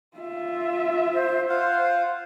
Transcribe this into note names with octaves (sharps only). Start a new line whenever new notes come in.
F4 E5
C5
F4 C5 F5 F#5